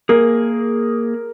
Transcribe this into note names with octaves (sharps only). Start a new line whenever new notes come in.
A#3 G#4 A#4